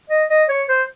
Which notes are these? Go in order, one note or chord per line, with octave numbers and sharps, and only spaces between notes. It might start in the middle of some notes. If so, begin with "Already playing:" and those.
D#5
D#5
C#5
C5